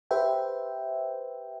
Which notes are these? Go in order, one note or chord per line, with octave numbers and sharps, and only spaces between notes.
G4 B4 C5 E5 G5